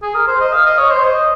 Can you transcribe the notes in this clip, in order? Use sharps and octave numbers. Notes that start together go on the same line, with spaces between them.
G#4
A#4
C5
D#5
F5
D#5
C#5
C5
D#5